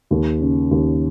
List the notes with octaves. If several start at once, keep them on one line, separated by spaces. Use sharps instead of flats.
D#2
C#3
D#2